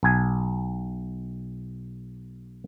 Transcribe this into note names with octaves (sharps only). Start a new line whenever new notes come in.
B1 G#5